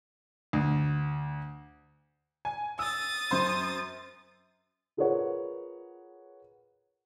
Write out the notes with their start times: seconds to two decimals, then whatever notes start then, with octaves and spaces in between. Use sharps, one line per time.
0.53 D2
2.45 G#5
2.79 D#6 E6 A6
3.31 F#2 C5 C6
4.97 F4 G#4 A#4 B4 C#5 F#5